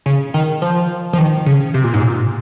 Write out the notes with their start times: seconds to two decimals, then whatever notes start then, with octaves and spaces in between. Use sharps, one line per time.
0.06 C#3
0.34 D#3
0.62 F3
1.13 F3
1.18 D#3
1.46 C#3
1.74 C3
1.84 A#2
1.94 G#2
2.04 A#2